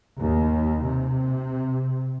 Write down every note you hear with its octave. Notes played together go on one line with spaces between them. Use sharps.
D#2
C3